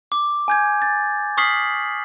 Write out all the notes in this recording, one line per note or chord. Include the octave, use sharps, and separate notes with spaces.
D6
G#5 G6 G#6
A6
C#6 D#6 F6 B6 C7 F#7